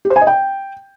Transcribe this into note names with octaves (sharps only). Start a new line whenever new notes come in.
G4
C5
G#5
D#5
G5